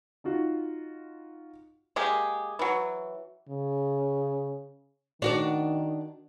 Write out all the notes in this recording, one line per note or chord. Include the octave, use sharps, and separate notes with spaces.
D#4 F4 F#4
G#3 A#3 G4 G#4
E3 F#3
C#3
D#3 D4 F#4 D5